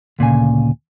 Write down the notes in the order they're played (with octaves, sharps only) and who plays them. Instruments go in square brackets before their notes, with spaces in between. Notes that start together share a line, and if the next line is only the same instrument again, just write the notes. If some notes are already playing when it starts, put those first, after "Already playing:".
[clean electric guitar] D2 A#2 C#3 G#5